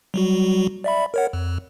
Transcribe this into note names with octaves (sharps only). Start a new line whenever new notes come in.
F#3 G3 F#4
D5 E5 B5
A#4 C#5 F#5
F2